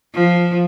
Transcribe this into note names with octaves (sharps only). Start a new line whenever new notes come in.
F3